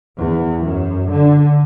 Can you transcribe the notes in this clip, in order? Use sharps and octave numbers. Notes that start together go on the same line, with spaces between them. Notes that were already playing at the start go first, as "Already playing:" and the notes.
E2
F#2
D3